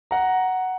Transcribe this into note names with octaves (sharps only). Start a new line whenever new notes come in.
F#5 A#5